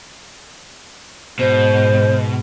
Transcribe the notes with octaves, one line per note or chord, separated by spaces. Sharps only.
G#2 B2 C5